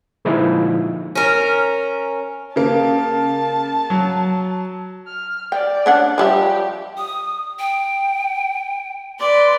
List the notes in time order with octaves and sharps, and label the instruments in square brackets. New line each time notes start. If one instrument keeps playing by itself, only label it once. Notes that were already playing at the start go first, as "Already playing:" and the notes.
[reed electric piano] A#2 D3 F3 G#3 D#4 E4
[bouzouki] C#4 A#4
[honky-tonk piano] C#3 A#3 [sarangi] A5
[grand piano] F#3
[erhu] F6
[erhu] D5 [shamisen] G5
[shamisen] C#4 D4 F#5
[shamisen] F3 G3 E5 [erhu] G4
[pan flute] D#6
G5
[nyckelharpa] B4 D5 [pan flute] C6